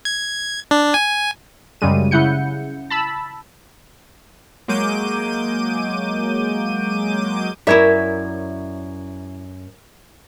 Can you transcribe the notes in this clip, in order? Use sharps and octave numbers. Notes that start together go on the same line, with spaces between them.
G#6
D4
G#5
F#2 C#3 G3 G#3 D#7
C#3 E4 F#5 G6 C#7
A5 B5 E6
F#3 G#3 A#3 D6 G6 D#7
F#2 E4 A#4 C#5 D5 E5